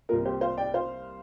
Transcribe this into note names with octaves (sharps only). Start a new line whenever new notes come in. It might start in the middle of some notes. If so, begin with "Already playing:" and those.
C2 C3 A#3 F4 A#4
G4 C5
C5 F5
D5 G5
C5 F5